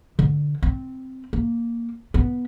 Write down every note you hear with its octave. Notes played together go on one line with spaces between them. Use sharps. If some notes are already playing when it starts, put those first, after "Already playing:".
D3
C4
A#3
B3